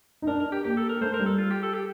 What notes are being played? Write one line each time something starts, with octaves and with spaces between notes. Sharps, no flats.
D#4
D4 A#4
A#4
G4
A#3 G4
A4
A#4
A3 C5
A#4
G3
A4
F4
G4
A4
G4